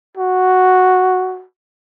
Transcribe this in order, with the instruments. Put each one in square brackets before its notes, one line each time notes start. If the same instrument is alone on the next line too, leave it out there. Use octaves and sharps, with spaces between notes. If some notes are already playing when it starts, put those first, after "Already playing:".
[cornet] F#4